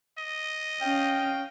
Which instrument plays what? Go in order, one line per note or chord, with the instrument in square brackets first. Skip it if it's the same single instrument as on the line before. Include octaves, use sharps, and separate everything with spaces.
[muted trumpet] D#5
[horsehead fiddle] C#4 F5 [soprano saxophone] G5